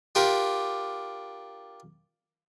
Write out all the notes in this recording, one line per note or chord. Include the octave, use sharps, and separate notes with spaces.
D4 F4 G4 A#4